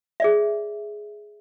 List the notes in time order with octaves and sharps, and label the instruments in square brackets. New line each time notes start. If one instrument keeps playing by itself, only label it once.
[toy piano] G#4 D5 E5